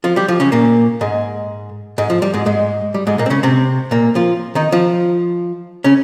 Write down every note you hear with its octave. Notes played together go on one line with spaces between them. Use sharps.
F3 F4
G3 G4
F3 F4
C#3 C#4
A#2 A#3
G#2 G#3
G#2 G#3
F3
G3
G#2 G#3
G#2 G#3
G3
G#2 G#3
A#2 A#3
C4
C#3 C#4
C3 C4
A#2 A#3
F3 F4
D#3 D#4
F3 F4
C#3 C#4